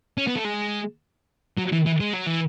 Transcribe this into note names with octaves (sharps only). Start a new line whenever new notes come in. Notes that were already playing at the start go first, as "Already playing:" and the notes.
C#4
B3
A3
G#3
F#3
E3
E3
G#3
F#3
E3